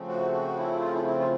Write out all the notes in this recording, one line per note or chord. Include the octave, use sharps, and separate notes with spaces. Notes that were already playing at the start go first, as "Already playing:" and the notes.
Already playing: C#3 F3 A3 C4
F#4
F#4
E4
F4
E4
E4
F4